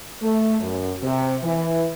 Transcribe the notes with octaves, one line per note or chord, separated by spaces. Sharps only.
A3
F#2
C3
E3